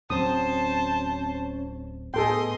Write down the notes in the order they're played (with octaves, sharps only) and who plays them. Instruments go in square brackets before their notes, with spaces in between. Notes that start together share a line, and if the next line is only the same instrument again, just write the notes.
[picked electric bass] D1 F#3 C4 [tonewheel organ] C#4 [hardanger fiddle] C5 A5 [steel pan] D#6
[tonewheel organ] A2 B3 [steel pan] G#4 A4 G5 [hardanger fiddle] D#5 C6